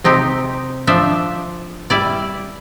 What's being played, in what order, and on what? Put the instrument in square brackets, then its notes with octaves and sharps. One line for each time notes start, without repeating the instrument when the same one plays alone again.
[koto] C3 C4 D#4 G4
F3 D4 C5 E5
G3 E4 D5